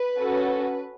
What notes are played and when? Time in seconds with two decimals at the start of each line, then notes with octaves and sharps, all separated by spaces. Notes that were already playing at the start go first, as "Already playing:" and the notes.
Already playing: B4
0.18 C#4 F#4 A4